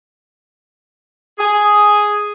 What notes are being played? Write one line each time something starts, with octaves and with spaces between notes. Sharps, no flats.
G#4